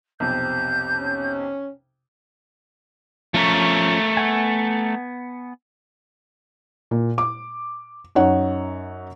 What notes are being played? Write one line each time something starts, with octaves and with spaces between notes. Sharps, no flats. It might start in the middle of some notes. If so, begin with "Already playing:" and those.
B1 F2 C3 G6
C#4
F3 A3 C#4 A#4 C#6
B3 F#5 G#5
A#2
D6
F#2 D#4 C#5 F#5